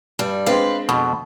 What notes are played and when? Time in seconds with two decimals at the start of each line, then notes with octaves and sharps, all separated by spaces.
0.19 G2 G3
0.46 G#3 C4 D4 B4 F5
0.89 F2 B2